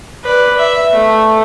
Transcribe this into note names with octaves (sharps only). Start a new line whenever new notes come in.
B4 D5
E5
A3